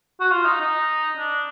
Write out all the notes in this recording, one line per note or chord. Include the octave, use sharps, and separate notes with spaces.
F#4
F4
D#4
D#4
D4